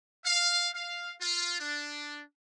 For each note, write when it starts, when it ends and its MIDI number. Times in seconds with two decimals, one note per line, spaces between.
0.25 0.68 77
0.74 1.12 77
1.21 1.56 65
1.59 2.20 62